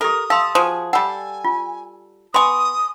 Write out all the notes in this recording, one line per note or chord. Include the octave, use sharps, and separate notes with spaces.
G4 A4 A#4 D#6
A4 F5 C6
F3 F#4 G#4
G3 A4 F#5 G#5
F4
B3 G#5 C6 C#6 D#6